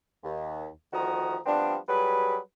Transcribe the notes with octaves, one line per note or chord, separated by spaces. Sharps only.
D#2
D2 D#3 F3 F#4 A#5 D#6
F3 G3 B3 C4 D4
F#3 G3 G#4 B4